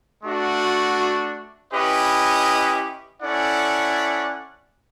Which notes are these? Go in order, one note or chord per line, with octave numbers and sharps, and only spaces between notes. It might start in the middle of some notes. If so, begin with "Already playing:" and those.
A3 D4 F#4
C#4 E4 G4 B4 D#5
C#4 E4 A4 D5 F#5